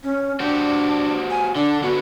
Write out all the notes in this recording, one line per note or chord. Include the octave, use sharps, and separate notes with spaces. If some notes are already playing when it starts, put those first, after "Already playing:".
C#4
D4 F#4 G4 C5
G#5
D3 D4
D3 B3 F#4